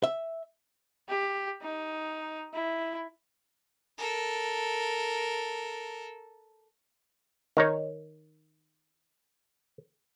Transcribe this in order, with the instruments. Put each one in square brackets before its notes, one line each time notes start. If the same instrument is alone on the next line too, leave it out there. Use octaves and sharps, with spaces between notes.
[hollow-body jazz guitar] E5
[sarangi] G4
D#4
E4
[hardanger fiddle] A4 A#4
[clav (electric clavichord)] D#3 D#4 C#5